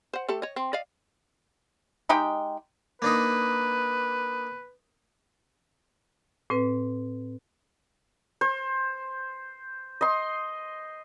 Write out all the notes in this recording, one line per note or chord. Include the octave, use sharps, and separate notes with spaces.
C5 F#5
A3 G4 A4
C#5 D#5
C4
D5 D#5 F5
G#3 D#4 G4 G5
A#3 D4 D#4 B4
A2 C4 B4
C5
D#5 C6